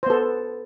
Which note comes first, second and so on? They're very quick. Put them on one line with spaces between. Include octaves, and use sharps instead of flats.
C5 B3 A4